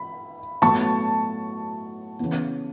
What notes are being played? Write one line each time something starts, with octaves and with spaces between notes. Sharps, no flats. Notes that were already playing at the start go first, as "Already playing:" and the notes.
Already playing: B5
A2 F#3 B3 A5 C#6
C#3 E3 B3